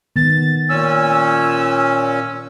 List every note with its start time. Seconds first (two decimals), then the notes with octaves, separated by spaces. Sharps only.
0.16 D#3 B3 A6
0.69 A#2 C#4 E6